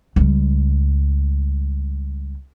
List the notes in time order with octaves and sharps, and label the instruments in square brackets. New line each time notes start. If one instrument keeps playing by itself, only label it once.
[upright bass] C#2 G3